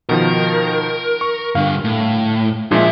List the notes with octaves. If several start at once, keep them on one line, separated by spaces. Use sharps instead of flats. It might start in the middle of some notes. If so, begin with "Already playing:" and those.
B2 D#3 F3 A#4
C#6
G2 D3 F5
A2
A#2 F3 G#3 D4 E5